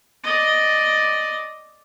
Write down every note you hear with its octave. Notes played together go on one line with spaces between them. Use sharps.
D5 D#5